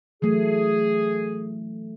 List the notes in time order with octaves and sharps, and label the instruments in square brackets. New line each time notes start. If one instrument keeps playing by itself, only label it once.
[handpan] E3 F#3 A3 [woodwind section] G#4